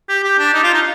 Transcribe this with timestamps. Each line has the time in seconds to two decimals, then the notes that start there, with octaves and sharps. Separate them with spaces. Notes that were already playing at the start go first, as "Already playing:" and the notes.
0.09 G4
0.24 G4
0.39 D4
0.54 D#4
0.63 F4
0.74 D#4